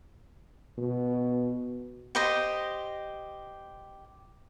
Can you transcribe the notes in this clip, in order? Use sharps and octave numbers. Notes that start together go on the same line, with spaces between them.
B2
G4 C5 D#5